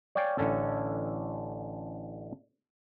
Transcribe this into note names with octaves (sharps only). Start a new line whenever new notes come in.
C#5 D5 F5 G5 G#5
A1 D3 C#4 A4